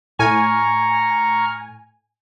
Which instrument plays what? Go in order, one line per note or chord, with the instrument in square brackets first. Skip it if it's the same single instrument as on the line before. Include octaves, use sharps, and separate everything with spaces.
[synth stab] A2 G#5 [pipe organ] A#5 C#6 F6